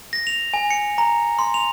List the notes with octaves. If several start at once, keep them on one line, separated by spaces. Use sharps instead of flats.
A#6
F7
G#5
C#7
A#5
C6
F7